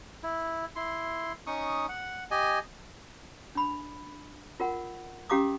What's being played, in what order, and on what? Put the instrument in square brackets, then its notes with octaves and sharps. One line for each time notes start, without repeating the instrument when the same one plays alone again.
[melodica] E4
E4 C6
C#4 D#4 C#6 D#6
F#5
G4 D#5 G#5
[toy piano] D4 B5
F4 A#4 F#5
C#4 G4 F5 A#5 D6 D#6